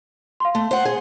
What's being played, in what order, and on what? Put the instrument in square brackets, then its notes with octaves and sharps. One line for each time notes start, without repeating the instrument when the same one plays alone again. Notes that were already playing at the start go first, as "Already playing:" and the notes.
[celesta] F5 C6
[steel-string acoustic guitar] A3
C5 F#5
G#4